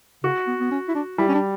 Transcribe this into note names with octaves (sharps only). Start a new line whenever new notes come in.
C#3 F#4
B3
B3
C#4
E4
D4
G3 E4
C#4
D4